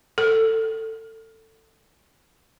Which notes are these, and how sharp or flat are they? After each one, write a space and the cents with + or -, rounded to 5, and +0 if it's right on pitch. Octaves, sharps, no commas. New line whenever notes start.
A4 +20